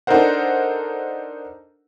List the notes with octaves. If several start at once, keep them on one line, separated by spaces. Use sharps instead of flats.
D4 D#4 A4 A#4 C5 F#5